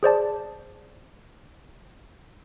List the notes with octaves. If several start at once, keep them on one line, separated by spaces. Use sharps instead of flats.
G#4 C5 D5 A5